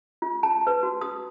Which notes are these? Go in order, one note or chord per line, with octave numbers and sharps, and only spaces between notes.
F4
A5
B4
F#4
D#6